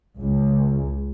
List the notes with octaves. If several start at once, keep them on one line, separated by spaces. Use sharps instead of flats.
C#2